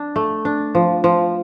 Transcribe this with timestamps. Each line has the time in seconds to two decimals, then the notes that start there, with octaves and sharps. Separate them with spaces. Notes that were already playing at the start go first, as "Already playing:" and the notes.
Already playing: D4
0.16 A3
0.45 D4
0.75 F3
1.04 F3